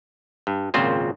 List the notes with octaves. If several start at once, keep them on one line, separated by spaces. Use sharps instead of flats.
G2
G#1 A#2 C#3 C4 F4 C5